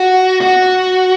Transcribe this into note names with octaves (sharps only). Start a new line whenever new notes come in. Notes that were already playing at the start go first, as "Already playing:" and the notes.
Already playing: F#4
F#4